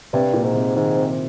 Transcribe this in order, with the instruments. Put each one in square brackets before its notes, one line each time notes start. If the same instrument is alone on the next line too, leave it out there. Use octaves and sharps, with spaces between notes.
[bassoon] G2 [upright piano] C3
[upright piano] A#2
[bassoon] G#2
[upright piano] C3
[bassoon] G#2 [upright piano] D#3
[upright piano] C4